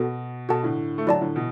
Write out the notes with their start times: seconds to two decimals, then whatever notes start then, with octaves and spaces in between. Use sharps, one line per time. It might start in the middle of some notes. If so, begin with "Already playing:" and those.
Already playing: B2 B3 F#4 A4
0.49 B2 F#4 A4 F#5 A5
0.63 A2 D3
0.98 A3
1.07 D3 F#3 E4 D5 A5
1.21 A2 D3
1.36 B2 E3